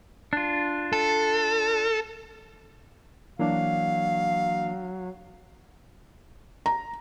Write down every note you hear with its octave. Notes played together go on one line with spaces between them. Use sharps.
D4 F4
A4
E3 F#3 A#3 D4 F5
A#5